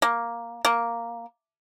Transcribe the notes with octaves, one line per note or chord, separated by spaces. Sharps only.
A#3
A#3